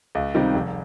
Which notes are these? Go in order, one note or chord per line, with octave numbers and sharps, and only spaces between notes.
C#2
C3 D#3 G3
F1